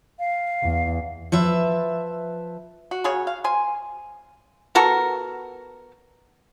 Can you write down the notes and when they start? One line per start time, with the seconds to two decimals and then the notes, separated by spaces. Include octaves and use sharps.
0.19 F5
0.63 E2
1.32 F3 B4 E5
2.91 F#4
3.04 C#3 F#4 G#4 C#5
3.27 F5
3.44 C5 G#5
4.75 B3 F#4 A4 A#4